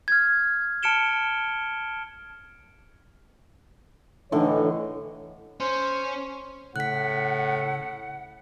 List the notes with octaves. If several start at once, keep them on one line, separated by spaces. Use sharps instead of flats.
F6 G#6
A5 F6 C#7 D7 E7 G7
A2 D3 E3 D#4 C#5
C#4 C5
A2 C#3 F#5 F#6 B6